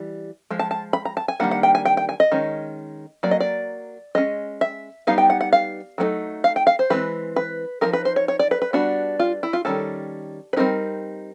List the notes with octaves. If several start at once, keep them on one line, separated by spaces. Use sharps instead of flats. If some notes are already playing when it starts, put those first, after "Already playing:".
Already playing: E3 G3
F3 G#3
A5
A5
B5
A#5
A5
G#5
D#3 G3 A#3 D4 F#5
F#5
G5
G#5
G5
G5
G#5
D#5
D#3 G#3 C#4
F#3 A#3 D5
D#5
D5
G#3 C#4 D#5
E5
G3 B3 D#4 F5
G5
F#5
F#5
F5
F#3 A3 C4 D#4
F5
G5
F5
C5
E3 G#3 C4 B4
B4
F3 A#3 D#4 A#4
B4
C5
C#5
C#5
D5
B4
B4
G3 B3 D4 F#4
F4
E4
F4
D#3 G3 A#3 C#4 A4
B4
G3 C4 D#4 A#4